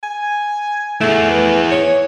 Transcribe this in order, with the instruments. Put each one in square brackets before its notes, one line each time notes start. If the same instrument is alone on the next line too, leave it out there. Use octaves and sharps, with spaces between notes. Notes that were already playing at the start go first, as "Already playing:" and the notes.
[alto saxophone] G#5
[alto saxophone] A3 [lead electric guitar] E4 G#4
[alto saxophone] B4
C#5